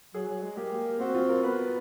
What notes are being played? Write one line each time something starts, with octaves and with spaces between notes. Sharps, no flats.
F#3 G#4
F#3
G#3
A#3 G4
C4 F#4
F4
A#4
B3 B4